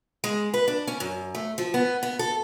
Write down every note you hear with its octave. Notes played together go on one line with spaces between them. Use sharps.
G#3
B4
D4
C#4
F#2
A3
F3
B3
B3
A4